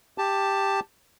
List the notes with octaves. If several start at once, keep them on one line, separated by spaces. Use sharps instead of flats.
G4 A5